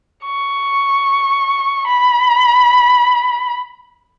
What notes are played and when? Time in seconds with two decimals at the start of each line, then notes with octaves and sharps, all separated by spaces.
0.24 C#6
1.86 B5